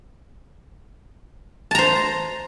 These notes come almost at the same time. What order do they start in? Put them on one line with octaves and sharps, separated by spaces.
A5 A#5 C5